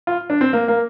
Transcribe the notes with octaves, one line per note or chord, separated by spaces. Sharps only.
F4
D4
C4
A#3
A#3